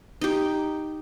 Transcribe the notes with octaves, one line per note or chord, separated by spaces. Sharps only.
D#4 G4